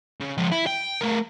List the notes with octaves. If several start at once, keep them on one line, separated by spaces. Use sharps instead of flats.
C#3
F3 G#3
E4
G5
A3 A#4